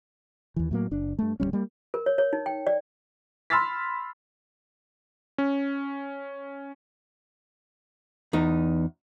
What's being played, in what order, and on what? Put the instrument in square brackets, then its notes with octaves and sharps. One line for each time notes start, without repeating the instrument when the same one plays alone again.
[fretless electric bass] D#2 E3
A2 F#3 A#3
F#1 D4
G2 A3
D1 E2 G3 C#4
G3 A#3
[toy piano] A#4
C#5
C#5
D#4
G5
D5
[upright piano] B5 C6 E6 F6 A6 B6
[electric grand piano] C#4
[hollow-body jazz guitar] E2 D#4